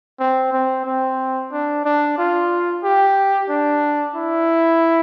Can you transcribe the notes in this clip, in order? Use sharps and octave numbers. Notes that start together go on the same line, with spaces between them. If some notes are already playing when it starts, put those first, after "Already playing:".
C4
C4
C4
D4
D4
F4
G4
D4
E4